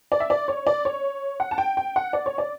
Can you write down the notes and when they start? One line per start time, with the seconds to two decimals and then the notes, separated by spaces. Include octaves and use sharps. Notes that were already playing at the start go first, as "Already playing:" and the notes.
0.12 D5
0.20 E5
0.30 D5
0.48 C#5
0.67 D5
0.85 C#5
1.40 F#5
1.51 A5
1.58 G5
1.77 G5
1.96 F#5
2.13 D5
2.26 C#5
2.38 D5